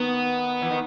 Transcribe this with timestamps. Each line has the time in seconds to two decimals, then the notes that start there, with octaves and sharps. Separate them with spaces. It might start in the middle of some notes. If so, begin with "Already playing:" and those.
Already playing: D#3 B3
0.62 E3
0.71 D#3